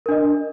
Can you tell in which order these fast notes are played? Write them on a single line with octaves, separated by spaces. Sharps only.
A#4 D4 D#5